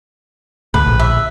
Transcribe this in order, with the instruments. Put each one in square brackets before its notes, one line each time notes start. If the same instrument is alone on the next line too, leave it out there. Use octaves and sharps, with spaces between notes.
[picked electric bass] D2 A2 [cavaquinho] B4
[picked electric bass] A#1
[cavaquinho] E5